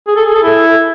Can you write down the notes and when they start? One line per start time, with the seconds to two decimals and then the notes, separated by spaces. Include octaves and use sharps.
0.07 G#4
0.17 A4
0.26 G#4
0.35 A4
0.44 E4